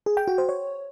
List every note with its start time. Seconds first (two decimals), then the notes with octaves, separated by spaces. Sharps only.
0.06 G#4
0.17 G5
0.28 F#4
0.38 C5
0.49 C#5